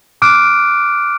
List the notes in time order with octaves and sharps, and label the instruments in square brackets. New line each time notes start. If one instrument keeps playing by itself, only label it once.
[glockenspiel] D6 F6 F#6 D7